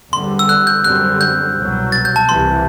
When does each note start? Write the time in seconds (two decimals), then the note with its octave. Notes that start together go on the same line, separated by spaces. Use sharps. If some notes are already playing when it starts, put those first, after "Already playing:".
0.13 E2 D3 G3 C4 C6
0.39 E6
0.49 F#6
0.67 G6
0.84 F#2 D3 G3 C4 F#6
1.21 G6
1.57 C2 B2 F#3
1.92 A6
2.05 G6
2.16 A5
2.28 C2 C3 E3 C6